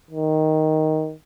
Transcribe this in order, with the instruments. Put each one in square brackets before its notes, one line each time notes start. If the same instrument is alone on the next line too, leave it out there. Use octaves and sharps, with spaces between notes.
[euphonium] D#3